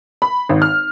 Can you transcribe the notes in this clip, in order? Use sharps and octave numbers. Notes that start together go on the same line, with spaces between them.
B5
G#1
F6